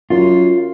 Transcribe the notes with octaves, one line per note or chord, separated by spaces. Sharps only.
F#2 F4